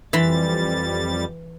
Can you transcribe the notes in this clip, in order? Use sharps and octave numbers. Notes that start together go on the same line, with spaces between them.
F2 E3 G3 B5 C6 A6